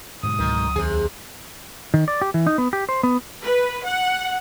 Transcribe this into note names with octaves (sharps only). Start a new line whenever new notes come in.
G#2 B2 D3 D#6
C#2 D#3 F#3
D#2 C3 G#4
D#3
D5
G4
E3
D#4
B3
G4
C5
B3
B4
F#5